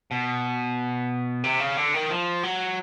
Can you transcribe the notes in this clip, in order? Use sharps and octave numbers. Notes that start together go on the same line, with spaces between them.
B2
C3
C#3
D3
D#3
F3
F#3